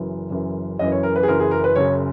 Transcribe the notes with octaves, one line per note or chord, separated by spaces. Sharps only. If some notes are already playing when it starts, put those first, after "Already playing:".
Already playing: F#1 F#2 E3
F#1 F#2 E3
F#1 F#2 E3 D#5
C#5
A#4
B4
G#4
F#1 F#2 E3 A#4
G#4
A#4
B4
F#1 F#2 C#3 C#5